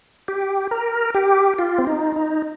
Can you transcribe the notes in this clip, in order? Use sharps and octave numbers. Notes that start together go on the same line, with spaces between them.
G4
A#4
G4
F4
C4
D#4
D#4